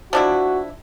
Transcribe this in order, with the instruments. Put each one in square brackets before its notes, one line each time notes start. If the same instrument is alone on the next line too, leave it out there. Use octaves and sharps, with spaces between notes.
[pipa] F3 D4 E4 [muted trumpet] F#4